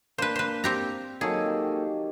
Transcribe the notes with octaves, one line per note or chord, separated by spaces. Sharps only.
A#3 D4 B4 C5
B4 C5
C4 G4 A#5
D#3 F#3 A#3 G#4 A4
G4